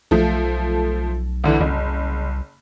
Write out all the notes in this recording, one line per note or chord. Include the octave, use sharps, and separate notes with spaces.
B1 F3 A3
D2 D3 E3
F#1 C2